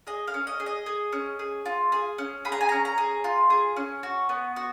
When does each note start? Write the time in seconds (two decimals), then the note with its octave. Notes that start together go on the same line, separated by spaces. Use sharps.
0.07 G#4 D#5
0.27 F5
0.34 C#4
0.47 D#5
0.60 G#4
0.66 D#5
0.86 G#4
1.12 C#4
1.39 G#4
1.65 F4
1.92 G#4
2.18 C#4
2.45 G#4 B5
2.52 A#5
2.61 G#5
2.69 C#4 A#5
2.85 A#5
2.98 G#4
3.24 F4
3.50 G#4
3.76 C#4
4.03 F#4
4.29 B3
4.56 F#4